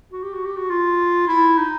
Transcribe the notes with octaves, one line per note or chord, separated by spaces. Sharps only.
F#4
G4
F#4
G4
F#4
F4
E4
D#4